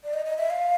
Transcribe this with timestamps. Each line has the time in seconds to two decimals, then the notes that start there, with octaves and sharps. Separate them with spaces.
0.04 D5
0.13 D#5
0.25 D#5
0.38 E5
0.50 F5